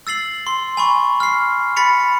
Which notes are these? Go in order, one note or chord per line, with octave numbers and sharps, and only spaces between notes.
E6 A6 C7 F#7
C6
G#5 B5 C#6
F6 C7
B5 A6 B6 C#7 F7